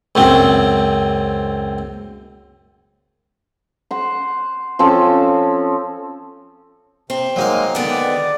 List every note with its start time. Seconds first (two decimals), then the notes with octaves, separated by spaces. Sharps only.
0.15 C#2 F#2 C4
3.91 C5 F#5
4.79 F3 C4 C#4 A4
7.10 C3 C4
7.36 F#3 G#3 A#3 D#4 F5
7.75 D3 D#3 B3 G#4 D5 F#5 D6